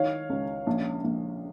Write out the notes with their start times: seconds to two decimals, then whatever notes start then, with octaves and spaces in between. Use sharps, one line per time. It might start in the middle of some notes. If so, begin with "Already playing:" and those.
Already playing: D#3 C#5 F5
0.30 C#2
0.67 A#1
1.04 A#1